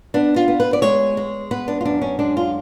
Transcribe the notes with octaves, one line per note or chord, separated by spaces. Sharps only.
B3 D4
F4
B3
B4
D5
G#3 C#5
G#3
B3 B4
D4
F4
F#2 D4
C#4
G#3 D4
F4